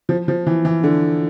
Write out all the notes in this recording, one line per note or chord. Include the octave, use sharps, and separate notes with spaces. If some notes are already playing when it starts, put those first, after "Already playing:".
F3
F3
E3
E3
D3